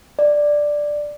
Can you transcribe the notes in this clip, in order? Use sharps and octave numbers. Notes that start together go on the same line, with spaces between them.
D5